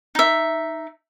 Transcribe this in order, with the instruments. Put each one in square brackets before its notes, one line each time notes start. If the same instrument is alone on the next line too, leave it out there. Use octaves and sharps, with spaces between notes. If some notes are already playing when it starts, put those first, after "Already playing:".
[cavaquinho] D#4 E5